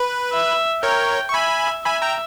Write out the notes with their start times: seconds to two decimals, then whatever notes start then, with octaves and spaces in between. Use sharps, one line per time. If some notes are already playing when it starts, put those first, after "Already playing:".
Already playing: B4
0.33 E5
0.83 A#4 C#5 G5
1.29 C#6
1.34 E5 G#5 B5
1.85 E5 G#5 B5
2.02 G5 A#5